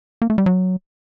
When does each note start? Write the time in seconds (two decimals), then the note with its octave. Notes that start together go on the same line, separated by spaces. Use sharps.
0.22 A#3
0.30 A3
0.38 G3
0.46 F#3